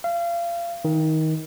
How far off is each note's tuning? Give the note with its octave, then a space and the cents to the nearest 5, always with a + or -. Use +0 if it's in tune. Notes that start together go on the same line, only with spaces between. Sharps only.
F5 -30
D#3 +20